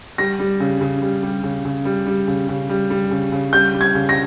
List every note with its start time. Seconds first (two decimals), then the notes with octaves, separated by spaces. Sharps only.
0.18 G3 A#6
0.39 G3
0.60 C#3
0.81 C#3
1.02 G3
1.23 G3
1.43 C#3
1.65 C#3
1.85 G3
2.07 G3
2.28 C#3
2.49 C#3
2.70 G3
2.90 G3
3.11 C#3
3.32 C#3
3.53 G3 G6
3.74 G3
3.81 G#6
3.95 C#3
4.09 A#6